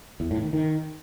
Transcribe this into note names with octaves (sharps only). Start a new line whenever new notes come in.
E2
A2
D#3
D#3